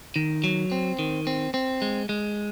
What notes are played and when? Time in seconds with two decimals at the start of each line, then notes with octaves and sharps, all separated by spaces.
0.16 D#3
0.44 F#3
0.72 C4
0.99 D#3
1.27 C4
1.54 C4
1.82 G#3
2.09 G#3